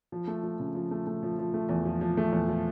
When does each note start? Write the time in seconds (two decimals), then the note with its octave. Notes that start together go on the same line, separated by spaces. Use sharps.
0.12 F3
0.27 A3
0.43 F3
0.60 C#3
0.75 F3
0.91 A3
1.07 A3
1.23 F3
1.39 F3
1.54 A3
1.69 E2
1.86 F3
2.01 F3
2.17 A3
2.32 E2
2.49 F3